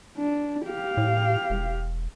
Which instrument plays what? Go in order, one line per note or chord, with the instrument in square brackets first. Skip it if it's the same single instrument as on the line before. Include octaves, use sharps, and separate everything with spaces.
[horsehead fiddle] D4
G4 F5
[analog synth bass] A2
E1